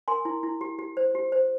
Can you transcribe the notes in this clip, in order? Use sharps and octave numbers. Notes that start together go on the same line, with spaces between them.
A#4 G#5 C6
E4
E4
G4
G4
C5
G4
C5